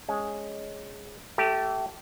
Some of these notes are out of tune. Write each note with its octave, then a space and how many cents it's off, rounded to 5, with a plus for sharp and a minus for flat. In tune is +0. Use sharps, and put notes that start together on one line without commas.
G#3 +0 C#4 +0
A3 +0 G4 -25